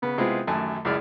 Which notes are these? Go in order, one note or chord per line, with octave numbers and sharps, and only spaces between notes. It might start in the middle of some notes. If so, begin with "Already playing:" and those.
C#3 B3
C3 G#3 B3 C4 E4 F4
A1 F#2 D#3 A3 G#5 A5
C#2 F#2 E4 G#4 D5 F6